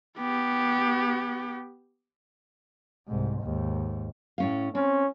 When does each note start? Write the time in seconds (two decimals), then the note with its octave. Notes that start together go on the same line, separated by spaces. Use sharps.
0.18 B3 G4
3.08 C2 G#2
3.41 D#2 G#2
4.38 A2 C#4 F5
4.75 C4 C#4